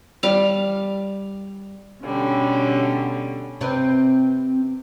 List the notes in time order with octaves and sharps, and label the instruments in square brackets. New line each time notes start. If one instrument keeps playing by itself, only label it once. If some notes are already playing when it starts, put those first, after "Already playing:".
[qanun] G3 F5
[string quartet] B2 D3 G3 C#4
[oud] C3 C4 B4